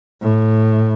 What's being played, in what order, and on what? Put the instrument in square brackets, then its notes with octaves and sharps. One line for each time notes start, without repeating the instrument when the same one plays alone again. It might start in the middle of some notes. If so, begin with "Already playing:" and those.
[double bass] A2